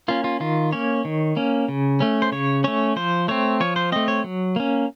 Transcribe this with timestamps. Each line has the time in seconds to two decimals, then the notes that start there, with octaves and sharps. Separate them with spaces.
0.08 A#3 C#4 F4
0.24 F4
0.40 D#3 F4
0.72 A#3 C#4 C#5
1.05 D#3
1.37 A#3 C#4
1.68 C#3
2.00 A3 C#4
2.22 C5
2.32 C#3 C#5
2.64 A3 C#4 C#5
2.96 F3 C5
3.28 A3 C4 C#5
3.60 F3 C#5
3.76 C5
3.92 A3 C4 D#5
4.08 C#5
4.24 F#3
4.56 A#3 C#4